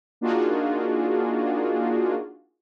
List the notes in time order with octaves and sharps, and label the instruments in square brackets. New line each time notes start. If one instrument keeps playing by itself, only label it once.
[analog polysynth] A#3 D4 D#4 F4 F#4 G#4